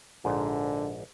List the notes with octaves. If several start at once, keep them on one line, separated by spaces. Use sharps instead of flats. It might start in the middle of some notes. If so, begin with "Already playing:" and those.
A#1 G#2 D3